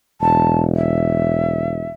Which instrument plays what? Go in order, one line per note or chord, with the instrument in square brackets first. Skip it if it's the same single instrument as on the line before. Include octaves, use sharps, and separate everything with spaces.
[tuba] E1 [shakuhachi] A5
[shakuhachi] E5